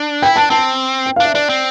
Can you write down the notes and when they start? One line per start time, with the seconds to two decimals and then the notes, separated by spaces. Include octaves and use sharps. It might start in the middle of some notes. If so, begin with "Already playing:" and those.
Already playing: D4
0.22 E4 G5
0.36 D4 A5
0.50 C4 A5
1.06 G5
1.16 F5
1.20 D4 E5
1.34 D4 D5
1.49 C4